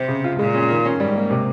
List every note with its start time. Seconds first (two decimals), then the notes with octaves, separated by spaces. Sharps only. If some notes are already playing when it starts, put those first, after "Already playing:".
Already playing: C3 C4
0.08 C#3
0.24 F4
0.39 A#2 G#3
0.54 C#4
0.70 D#3
0.85 C#4
1.00 G#2 G3
1.16 A#3
1.31 C3